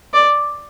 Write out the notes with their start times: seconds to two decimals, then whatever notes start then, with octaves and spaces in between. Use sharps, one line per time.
0.14 D5